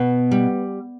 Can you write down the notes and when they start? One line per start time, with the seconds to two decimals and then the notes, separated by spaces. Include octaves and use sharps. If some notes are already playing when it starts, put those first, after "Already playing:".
Already playing: B2 B3
0.31 G3